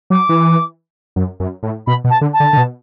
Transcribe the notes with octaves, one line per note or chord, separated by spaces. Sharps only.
F#3 D6
E3
F#2
F#2
A2
B2 B5
B2
A5
D3
A5
D3
D3
B2